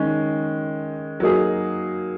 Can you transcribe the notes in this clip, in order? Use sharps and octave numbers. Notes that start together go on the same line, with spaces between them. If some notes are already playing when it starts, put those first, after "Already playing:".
Already playing: D#3 G#3 C#4
F#3 A#3 D#4 G#4